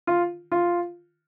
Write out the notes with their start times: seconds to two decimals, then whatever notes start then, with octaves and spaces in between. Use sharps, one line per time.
0.07 F4
0.52 F4